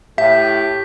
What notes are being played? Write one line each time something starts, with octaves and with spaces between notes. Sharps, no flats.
A2 G4 E5 B6